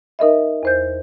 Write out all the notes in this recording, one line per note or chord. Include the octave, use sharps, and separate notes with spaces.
D#4 A#4 D#5 E5
E2 C5 G6